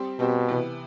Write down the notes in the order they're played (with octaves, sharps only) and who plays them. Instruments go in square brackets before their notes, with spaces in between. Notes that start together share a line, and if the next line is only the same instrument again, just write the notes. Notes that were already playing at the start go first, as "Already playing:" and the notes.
Already playing: [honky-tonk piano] G3 C4 G4 C5
[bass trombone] B2 [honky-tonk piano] G3 C4 G4 C5
[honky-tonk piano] C3 E3 B3